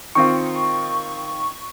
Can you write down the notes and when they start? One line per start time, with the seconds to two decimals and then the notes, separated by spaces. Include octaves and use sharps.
0.15 D#3 C4 F4 C#6